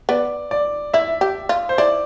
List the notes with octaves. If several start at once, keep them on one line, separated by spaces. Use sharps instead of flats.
B3 D5
D5
E4 E5
G4
F4
C5
E4 D5